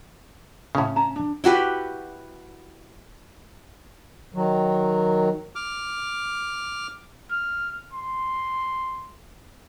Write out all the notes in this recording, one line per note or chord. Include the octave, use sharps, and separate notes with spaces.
A2 C#3 C#4 D4 C#5
C#4 A5 A#5
D4
E4 F#4 G4 B4
D#3 F#3
D6 F6
F6
C6